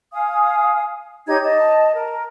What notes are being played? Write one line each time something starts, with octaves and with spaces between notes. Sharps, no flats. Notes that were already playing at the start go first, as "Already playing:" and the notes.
F5 G#5 D#6
D#4 G4 C#5 G#6
D#5 A5
A#4